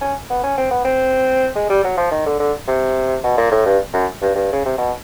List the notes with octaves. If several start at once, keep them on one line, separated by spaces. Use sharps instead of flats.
C#4
B3
C#4
C4
B3
C4
G#3
G3
F#3
F3
D#3
D3
D3
C3
B2
A#2
A2
G2
F#2
G2
G2
C#3
C3
B2